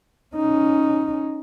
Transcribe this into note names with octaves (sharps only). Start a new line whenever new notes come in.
C#4 D#4